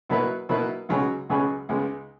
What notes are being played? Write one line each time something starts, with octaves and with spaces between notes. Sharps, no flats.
B2 F#3 A#3 E4 B4
B2 F#3 A#3 E4 B4
C#2 B2 F#3 C#4 G#4
C#2 B2 F#3 C#4 G#4
C#2 C#3 G#3 B3